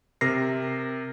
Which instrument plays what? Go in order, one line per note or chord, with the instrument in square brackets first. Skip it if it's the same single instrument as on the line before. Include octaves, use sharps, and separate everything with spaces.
[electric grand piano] C3 A#4 A#6 C7